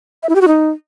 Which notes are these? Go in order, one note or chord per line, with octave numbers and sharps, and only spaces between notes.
E5
E4
G4
F#4
D#4